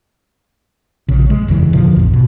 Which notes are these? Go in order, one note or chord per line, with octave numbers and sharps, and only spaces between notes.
A#1 C#3
G#3
F#1 E2 C#3 E3
A#2 D3 F3
A1 E2
B2